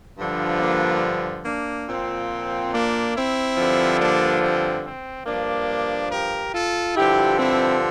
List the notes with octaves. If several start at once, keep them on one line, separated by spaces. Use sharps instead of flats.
G2 D3 F3
A#3 D4
A#3 D4
A#2 F3 C4
A#3 D4
C4 E4
G2 D3 F3
A#3 D4
C4
C4
G2 F3 A#3 D4
G4 A#4
F4 A4
G2 D3 F3 E4 G4
C4 E4